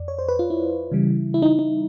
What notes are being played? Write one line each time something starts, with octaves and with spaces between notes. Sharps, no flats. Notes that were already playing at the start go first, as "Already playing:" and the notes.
Already playing: F2 D5
C#5
C5
B4
F4
E4
C#3 E3 G3
E4
D#4
D#4